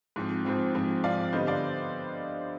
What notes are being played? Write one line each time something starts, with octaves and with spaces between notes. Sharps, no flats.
G#2 F3 C4
G#2 F3 C4
G#2 F3 C4
G#2 F3 C4 D5 F5
D3 G3 B3 C5 D#5
D5 F5